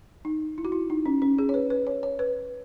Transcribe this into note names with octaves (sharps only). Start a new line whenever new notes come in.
D#4
E4
F#4
E4
D#4
C#4
C#4
G#4
C#5
B4
B4
C#5
C#5
B4